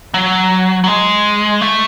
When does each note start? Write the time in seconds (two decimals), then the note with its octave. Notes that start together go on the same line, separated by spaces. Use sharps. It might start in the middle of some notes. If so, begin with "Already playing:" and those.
0.14 F#3
0.84 F#3
0.88 G#3
1.61 A3